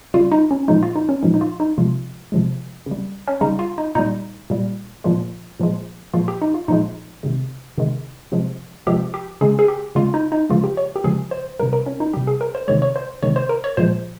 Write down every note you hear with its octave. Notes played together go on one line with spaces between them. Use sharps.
C#3 G3 F4
D#4
C#4
A#2 F3 G#3 D#4
F4
D#4
C#4
A#2 F3 G#3 D#4
D#4
F4
D#4
C3 F3 G#3 F4
C3 F3 G#3
C#3
G3
C#4
C#3 G3 D#4
F4
D#4
A#2 G3 D#4
A#2 G3
A#2 F3 G#3
A#2 F3 G#3
A#2 F3 G#3 F4
G4
D#4
F4
A#2 F3 G#3 D#4
C3 D#3 G#3
C3 D#3 G#3
C3 F3 G#3
C3 F3 G#3 G4
G4
C#3 G#3 G#4
G#4
G4
C#3 G#3 F4
D#4
D#4
C#3 F3 G#3 F4
G4
C#5
G4
C#3 F3 G#3 G#4
C5
C3 G3 A#4
A#4
C#4
D#4
C3 G3 G4
G#4
A#4
C5
C3 D#3 G#3 C#5
C#5
C5
C3 D#3 G#3 C#5
C5
A#4
C#5
A#2 F3 G#3 C5